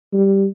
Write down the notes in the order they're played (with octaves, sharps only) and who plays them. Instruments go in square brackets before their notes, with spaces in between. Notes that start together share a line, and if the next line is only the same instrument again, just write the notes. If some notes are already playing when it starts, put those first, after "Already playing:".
[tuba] G3